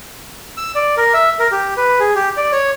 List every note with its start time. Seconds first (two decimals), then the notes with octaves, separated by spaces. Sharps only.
0.57 E6
0.75 D5
0.97 A#4
1.14 E5
1.39 A#4
1.52 G4
1.77 B4
2.00 G#4
2.15 G4
2.37 D5
2.52 C#5